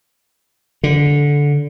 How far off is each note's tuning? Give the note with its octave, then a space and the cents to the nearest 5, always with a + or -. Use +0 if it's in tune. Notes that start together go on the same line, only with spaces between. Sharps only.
D3 -15